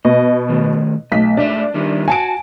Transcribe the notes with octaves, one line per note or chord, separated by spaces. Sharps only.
B2 D#5
A2 D#3
B1 A3 B6
G#2 A3 D4 E5
D#3 G3 E4
F#4 G#5 A5 D7